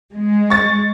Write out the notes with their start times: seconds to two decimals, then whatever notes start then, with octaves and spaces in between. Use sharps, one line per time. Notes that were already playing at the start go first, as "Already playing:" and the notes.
0.14 G#3
0.50 C#6 A6